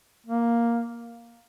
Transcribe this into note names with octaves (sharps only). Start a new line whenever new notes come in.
A#3